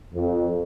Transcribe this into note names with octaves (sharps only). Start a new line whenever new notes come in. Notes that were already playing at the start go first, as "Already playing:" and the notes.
F2